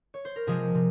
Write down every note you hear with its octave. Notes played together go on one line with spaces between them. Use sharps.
C#5
C5
A#4
C3 F3 G#3 G#4
C3